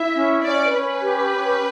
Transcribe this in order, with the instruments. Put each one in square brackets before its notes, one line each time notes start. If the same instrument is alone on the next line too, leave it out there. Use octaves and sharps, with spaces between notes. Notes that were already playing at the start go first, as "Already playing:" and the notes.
Already playing: [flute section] E4 [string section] E5
[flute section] C#4
[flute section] C#4 [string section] D5
[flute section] C#4 [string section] B4
[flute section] G4
C#4